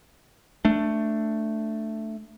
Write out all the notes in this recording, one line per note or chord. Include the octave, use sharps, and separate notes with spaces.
A3 D4